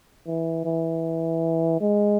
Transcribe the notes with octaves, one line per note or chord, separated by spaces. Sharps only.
E3
E3
G#3